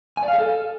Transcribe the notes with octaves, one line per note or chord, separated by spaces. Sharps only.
G#5
D5
F5
G#4
A4